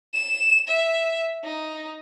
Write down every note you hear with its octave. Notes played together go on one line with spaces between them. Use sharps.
E7
E5
D#4